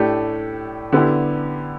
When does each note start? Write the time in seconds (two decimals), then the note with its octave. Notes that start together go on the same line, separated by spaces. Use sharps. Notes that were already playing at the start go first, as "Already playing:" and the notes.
Already playing: A2 A3 D4 G4
0.92 D3 B3 E4 G4